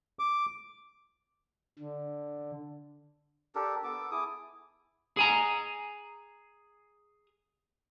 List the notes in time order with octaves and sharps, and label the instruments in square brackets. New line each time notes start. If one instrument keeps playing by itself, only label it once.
[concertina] D6
[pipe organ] D3
[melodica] D4 G4 A4 A#4
B3 A4 D6
E4 G#4 D6 D#6
[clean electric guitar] G#4 G#5 A#5